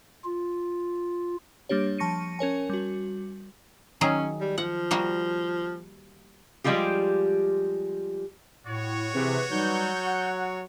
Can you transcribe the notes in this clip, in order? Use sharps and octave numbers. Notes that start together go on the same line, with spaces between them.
F4
G3 A#3 D4 G4 C#5
F3 A5 C#6 A#6 C#7 D#7
C#4 A#4 C#5 G#5
G3 F#4
D#3 F#3 C#4 G#4
G3
F3 F#5
G3 A#3 F#4
F3 G3 G#3 F4 G4
A2 F#4 C#5
C3 E3 G4 G#4 B4
E3 F#3 G3 D#4 G6
F#5